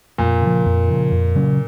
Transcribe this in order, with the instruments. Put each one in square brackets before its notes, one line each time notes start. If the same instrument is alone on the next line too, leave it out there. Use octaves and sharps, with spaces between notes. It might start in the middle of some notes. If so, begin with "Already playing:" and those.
[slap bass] F2 [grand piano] A#2
[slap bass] C#3 F3
F2
C#3 F3
F2
C#3 F#3 C#4